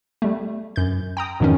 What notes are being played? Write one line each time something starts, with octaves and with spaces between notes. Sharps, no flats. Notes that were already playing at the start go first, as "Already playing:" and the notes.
G3 A3
F#2 G6
G5 A#5 D#6
F2 G#2 B2 D#3 E3 C#4